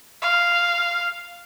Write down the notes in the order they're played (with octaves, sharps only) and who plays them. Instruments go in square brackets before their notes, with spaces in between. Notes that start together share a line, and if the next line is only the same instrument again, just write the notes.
[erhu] F5